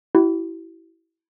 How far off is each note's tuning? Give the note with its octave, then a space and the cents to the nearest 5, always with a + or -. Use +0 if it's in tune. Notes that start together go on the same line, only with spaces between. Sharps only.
E4 +0 G4 -45